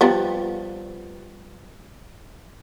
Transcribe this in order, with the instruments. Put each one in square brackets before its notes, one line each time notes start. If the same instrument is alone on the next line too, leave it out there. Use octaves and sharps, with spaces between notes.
[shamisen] F3 G3 B3